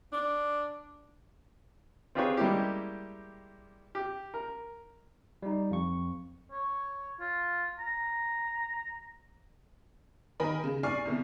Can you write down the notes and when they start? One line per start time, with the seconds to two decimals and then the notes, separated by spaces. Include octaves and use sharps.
0.13 D4
2.15 C4 F4 G4 G#4 B4 C#5
2.37 G3 G#3 A#3 C#4 E4 G4
3.95 G4
4.34 A#4
5.42 G3 D#4
5.71 F2 C#6
6.52 C#5
7.20 F4
7.79 A#5
10.40 D#3 A#4 D#5 G#5 B5
10.64 C#3
10.83 D5 G#5 C#6 F6 C7
11.05 C2 B2 D3